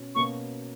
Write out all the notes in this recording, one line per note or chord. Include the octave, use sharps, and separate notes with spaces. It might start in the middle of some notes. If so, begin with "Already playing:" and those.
Already playing: B2 C#4
B2 A#3 C#4 C#6